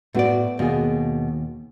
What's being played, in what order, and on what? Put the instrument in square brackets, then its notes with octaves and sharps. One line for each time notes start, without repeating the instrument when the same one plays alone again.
[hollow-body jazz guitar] A2 D5 [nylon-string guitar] A3 B3 F#4
[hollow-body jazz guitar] D#2 [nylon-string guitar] B2 A#3 G#4